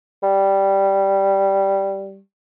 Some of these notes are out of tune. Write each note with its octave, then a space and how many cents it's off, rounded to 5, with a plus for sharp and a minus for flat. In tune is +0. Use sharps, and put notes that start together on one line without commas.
G3 -5